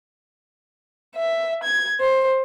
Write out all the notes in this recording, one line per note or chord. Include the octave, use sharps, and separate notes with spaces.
E5
G#6
C5